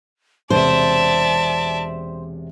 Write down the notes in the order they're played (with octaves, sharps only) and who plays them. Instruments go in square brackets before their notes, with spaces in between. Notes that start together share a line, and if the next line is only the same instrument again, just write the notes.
[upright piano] E1 C3 G#4 [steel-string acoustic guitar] C5 [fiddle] D5 E5 [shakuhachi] A5